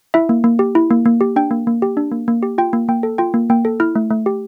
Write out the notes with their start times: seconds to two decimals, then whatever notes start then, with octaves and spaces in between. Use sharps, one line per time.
0.14 E4 E5
0.29 A#3
0.44 A#3
0.59 G4
0.75 E4
0.91 A#3
1.05 A#3
1.21 G4
1.36 D4 G5
1.51 A#3
1.67 A#3
1.82 G4
1.97 D4
2.12 A#3
2.28 A#3
2.43 G4
2.58 F4 G5
2.73 A#3
2.88 A#3 G5
3.03 A4
3.18 F4 G5
3.34 A#3
3.50 A#3 G5
3.65 A4
3.80 E4 F6
3.95 A3
4.10 A3
4.26 G4